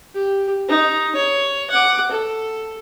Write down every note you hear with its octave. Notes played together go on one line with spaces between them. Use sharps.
G4
D#4
C#5
F#5 D6
A4